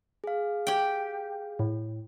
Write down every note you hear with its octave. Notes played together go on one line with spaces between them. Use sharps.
G#4 F5
G4 G5
A2